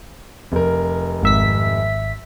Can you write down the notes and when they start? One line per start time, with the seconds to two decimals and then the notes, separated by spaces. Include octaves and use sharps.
0.52 F1 A#4
1.23 G#1 E5 B6